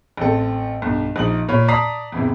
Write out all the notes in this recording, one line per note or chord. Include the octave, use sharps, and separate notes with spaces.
A1 C4 A4
B1 G2
A#1 D#4 F#7
A#2 C#5 B5
D5 A5 A#5 D#6 B6 C7
E2 G#2 C3 E3